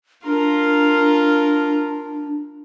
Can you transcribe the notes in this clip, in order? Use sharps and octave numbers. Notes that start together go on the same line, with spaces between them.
D4 F4 A#4